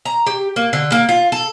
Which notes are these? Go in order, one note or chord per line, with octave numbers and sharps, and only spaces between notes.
A#5
G4
A#3
D3
A#3
F4
A4